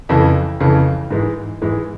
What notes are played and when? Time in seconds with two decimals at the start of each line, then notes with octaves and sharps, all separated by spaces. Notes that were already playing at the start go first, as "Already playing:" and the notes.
0.09 F2 C#3 E3
0.60 F2 C#3 E3
1.10 G#2 E3 G#3
1.62 G#2 E3 G#3